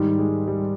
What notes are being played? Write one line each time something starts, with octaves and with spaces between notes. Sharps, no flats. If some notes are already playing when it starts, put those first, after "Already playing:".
Already playing: G#2 D#3 G3
G#3
G3